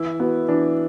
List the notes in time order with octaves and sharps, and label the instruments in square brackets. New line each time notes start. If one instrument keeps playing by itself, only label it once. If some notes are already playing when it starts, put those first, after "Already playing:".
Already playing: [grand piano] E3 [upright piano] E4
[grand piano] B3 F#4
[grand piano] E3 [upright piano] D4